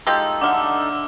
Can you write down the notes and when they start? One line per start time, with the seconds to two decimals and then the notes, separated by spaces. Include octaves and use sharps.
0.07 G#3 D#4 F4 G4 A4 E6
0.41 D3 D5 E5 D6 F6